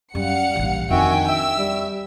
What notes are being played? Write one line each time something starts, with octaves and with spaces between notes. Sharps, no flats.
F#2 G3 F5 F#5 C#7
A#1 E3
F2 D#3 D4 F#4 E5 G5 G#5
E5 E6
G3